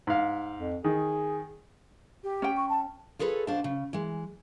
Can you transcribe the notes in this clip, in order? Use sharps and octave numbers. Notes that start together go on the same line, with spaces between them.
G#2 F5
F2
D#3 G#4
G4
C#4 G5
C#6
A5
F4 G#4 A4 B4 C#5
B2 D4 C5 F5 A5
C#3
E3 G#3